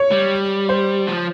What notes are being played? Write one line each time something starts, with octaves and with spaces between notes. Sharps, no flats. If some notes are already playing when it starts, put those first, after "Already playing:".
Already playing: C#5
G3
C5
F3